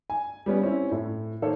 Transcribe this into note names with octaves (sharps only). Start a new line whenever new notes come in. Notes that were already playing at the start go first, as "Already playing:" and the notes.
G#5
G3 B3 C#4
C4 C#4 E4
A2
D#3 A#3 A4 C5 C#5